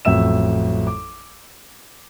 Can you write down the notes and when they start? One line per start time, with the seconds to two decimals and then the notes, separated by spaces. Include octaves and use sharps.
0.05 A1 F2 F#3 E5 E6 E7
0.87 D6